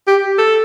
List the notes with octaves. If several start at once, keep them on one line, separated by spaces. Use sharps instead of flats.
G4
A4